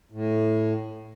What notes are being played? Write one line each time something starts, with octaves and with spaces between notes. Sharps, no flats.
A2